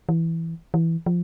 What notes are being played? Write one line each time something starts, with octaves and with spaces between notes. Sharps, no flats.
E3
E3
F3